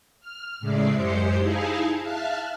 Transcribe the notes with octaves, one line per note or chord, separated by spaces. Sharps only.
F6
A2 C#3 G#3 D5 E5 C7
F#2 G#3 G4 C5 C7 C#7
D#4 E4 G#4 F5 G#5 A5
E5 F5 A5 F6 F#6